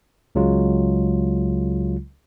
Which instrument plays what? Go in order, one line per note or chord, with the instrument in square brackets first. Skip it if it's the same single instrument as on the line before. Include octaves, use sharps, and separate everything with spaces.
[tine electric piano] C#2 C#3 F#3 G#3 F4